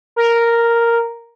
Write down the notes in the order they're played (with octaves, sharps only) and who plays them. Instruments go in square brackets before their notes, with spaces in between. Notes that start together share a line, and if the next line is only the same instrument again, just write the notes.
[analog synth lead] A#4